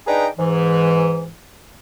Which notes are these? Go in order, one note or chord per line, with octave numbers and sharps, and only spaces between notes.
D4 D#4 G#4 B4 G5 A#5
G#2 E3